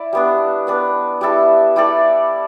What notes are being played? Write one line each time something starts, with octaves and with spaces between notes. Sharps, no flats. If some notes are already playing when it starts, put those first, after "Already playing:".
Already playing: E4 D5
G3 B3 D4
B3 D4 B4
G3 E4 A4
G3 E4 A4 D5